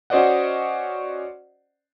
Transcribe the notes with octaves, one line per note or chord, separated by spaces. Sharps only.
C#4 F#4 C5 D5 D#5 F#5